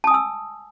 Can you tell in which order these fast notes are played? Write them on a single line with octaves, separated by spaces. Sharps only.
A5 D#6 G#5 E6